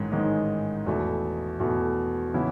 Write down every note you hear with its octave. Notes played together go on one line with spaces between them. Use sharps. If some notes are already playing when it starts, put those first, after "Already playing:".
Already playing: A1 G#2 D#3 G#3 D#4
A1 G#2 D#3 G#3 D#4
E2 B2 A3
E2 B2 A3
C#3 E3 B3 E4